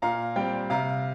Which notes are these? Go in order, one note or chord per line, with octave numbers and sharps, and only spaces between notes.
A#2 F5 A#5
G3 C4 G5
C3 F5 A#5